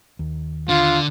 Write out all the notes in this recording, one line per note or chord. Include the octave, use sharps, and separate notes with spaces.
D#2
D3 F4